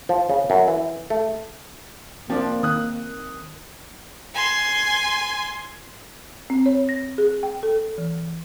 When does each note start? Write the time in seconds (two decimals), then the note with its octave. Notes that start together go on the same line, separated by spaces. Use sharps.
0.09 F3
0.30 C#3
0.50 F#2
0.68 E3
1.10 A3
2.30 F3 A#3 C4 D4
2.63 D#3 D#6 F#6
4.34 G#5 C6
6.50 C4
6.66 C#5
6.89 A#6
7.18 G#4
7.43 G5
7.63 A4
7.98 E3